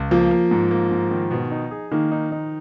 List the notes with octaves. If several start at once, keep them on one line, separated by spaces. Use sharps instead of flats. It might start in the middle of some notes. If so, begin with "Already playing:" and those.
Already playing: C#2
F3 A#3
A#3
G#2
A#3
G#2
D#3
B2
D#4
G#4
D#3 A#3
D#4
D#4